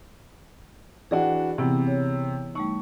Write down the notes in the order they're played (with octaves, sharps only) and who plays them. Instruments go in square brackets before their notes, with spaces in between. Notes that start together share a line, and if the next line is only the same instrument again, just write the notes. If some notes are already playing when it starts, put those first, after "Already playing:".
[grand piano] E3 D4 F#4 [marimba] G#4 F#5 G5
[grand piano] C3 [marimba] E3 B3 E4
[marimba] C#5
[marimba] G3 A3 D#4 [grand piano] C#6